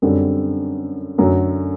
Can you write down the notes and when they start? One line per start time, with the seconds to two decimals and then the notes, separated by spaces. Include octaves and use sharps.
0.02 F#2 D3 G3 C4
1.18 F#2 D3 F#3 A3